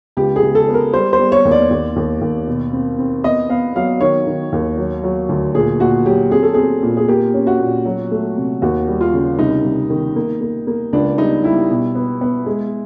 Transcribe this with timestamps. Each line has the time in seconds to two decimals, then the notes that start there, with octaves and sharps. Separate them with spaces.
0.17 C#2 G4
0.36 G#4
0.42 C#2
0.55 A4
0.68 B3
0.74 A#4
0.93 G3 C5
1.13 C5
1.19 G3
1.32 C#5
1.45 D#2
1.51 D5
1.71 D#2
1.96 D#2
2.21 D#2
2.47 B2
2.73 C4
2.98 C4
3.24 B3 D#5
3.49 B3 F5
3.75 F#3 F5
4.00 D#3 C#5
4.27 D#3
4.52 D#2
4.78 F#3
5.03 F#3
5.29 D2
5.55 A#2 G#4
5.80 A#2 F#4
6.06 F#3 G4
6.32 C4 G#4
6.43 A4
6.54 C4 G#4
6.83 A#2
6.97 G#4
7.08 A#3 G4
7.34 C#4
7.47 F#4
7.60 A#2
7.85 F#3
8.11 A3
8.37 C3
8.62 D#2 F#4
8.88 G3
9.01 F4
9.14 C#3
9.39 C2 D#4
9.64 C2
9.90 D#3
10.16 A#3
10.41 A#3
10.67 A#3
10.93 C#2 D4
11.18 G3 D#4
11.44 G3 E4
11.70 B2
11.95 B3
12.21 B3
12.46 G#3